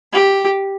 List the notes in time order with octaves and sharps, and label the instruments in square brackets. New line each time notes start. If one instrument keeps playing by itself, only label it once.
[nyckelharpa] G4